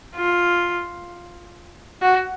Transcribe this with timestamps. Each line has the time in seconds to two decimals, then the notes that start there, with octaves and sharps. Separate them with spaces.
0.16 F4
2.02 F#4